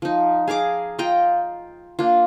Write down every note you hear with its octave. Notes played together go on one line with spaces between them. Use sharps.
F3 D#4
G#4 F5 A#5 D6
F4 D#5 G5 A#5
A#3 D4 F4